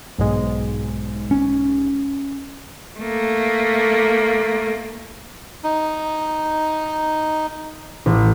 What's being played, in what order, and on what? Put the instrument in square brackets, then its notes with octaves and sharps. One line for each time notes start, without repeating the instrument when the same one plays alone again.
[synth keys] B1 G#2 G#3
[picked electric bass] C#4
[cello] A3 A#3
[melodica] D#4
[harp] A1